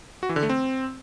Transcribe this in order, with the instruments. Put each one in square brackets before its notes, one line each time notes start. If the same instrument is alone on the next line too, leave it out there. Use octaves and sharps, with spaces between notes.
[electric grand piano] F#4
E3
D3
A3
C4